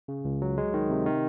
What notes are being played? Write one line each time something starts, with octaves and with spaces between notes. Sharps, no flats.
C#3
C#2
F#3
G#3
D#3
C3
D#3